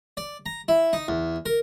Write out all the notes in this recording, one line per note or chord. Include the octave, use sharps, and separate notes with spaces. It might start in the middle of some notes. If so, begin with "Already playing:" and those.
D5
A#5
E4
D#4
E2
A#4